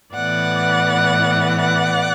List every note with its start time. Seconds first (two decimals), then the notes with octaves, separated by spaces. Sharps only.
0.14 A2 E3 B3 D5 F#5
1.58 D5 F#5